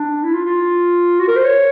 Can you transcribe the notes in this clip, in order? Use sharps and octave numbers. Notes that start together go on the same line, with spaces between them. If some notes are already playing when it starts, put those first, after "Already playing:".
Already playing: D4
E4
F4
F4
F#4
A#4
C5
C#5